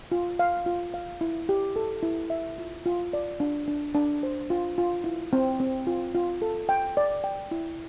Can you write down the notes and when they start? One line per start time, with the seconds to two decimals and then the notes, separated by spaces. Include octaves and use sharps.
0.12 F4
0.39 F5
0.66 F4
0.94 F5
1.21 E4
1.49 G4
1.76 A4
2.03 E4
2.30 E5
2.58 F4
2.86 F4
3.13 D5
3.40 D4
3.68 D4
3.94 D4
4.23 C5
4.50 F4
4.78 F4
5.04 E4
5.33 C4
5.60 C4
5.87 F4
6.15 F4
6.42 A4
6.69 G5
6.97 D5
7.24 G5
7.51 E4